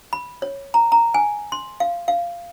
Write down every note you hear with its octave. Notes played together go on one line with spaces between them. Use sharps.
B5
C#5
A#5
A#5
G#5
C6
F5
F5